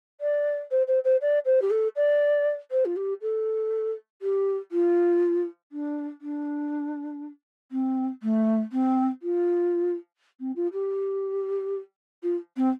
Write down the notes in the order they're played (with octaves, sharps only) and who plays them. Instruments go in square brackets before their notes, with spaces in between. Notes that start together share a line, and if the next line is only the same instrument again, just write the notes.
[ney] D5
C5
C5
C5
D5
C5
G4
A4
D5
C5
F4
G4
A4
G4
F4
D4
D4
C4
A3
C4
F4
C4
F4
G4
F4
C4